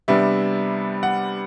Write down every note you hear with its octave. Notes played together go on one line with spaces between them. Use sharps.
C3 G3 B3 D4 E5
F#5